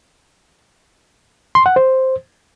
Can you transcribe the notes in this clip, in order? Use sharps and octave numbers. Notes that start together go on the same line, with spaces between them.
C6
F#5
C5